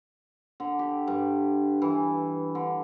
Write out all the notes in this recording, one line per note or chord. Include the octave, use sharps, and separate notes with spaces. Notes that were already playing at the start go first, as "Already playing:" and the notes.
D3
G4
G2
E3
D3